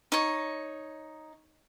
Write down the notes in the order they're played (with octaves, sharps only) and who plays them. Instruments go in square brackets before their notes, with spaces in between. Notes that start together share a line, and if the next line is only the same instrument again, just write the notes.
[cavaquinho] D#4 C#5